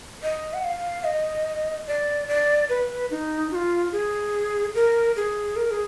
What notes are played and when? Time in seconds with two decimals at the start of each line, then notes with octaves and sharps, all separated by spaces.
0.23 D#5
0.54 F#5
0.64 F5
1.04 D#5
1.87 D5
2.28 D5
2.69 B4
3.11 D#4
3.52 F#4
3.55 F4
3.92 G#4
4.75 A#4
5.16 G#4
5.56 A#4
5.71 G#4